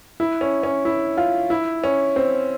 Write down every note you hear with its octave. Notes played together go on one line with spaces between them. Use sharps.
E4
C#4
C#4
E4
F4
E4
C#4
C4